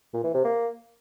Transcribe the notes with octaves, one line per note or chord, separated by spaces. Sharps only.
A#2
E3
C3
A#3